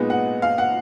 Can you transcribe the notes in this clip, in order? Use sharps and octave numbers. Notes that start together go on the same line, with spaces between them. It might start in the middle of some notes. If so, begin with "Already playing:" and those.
Already playing: A#2 G#3 B3 D#4 D#5
F#5
F5
F#5